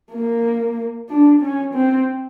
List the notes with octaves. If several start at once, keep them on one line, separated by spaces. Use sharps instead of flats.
A#3
D4
C#4
C4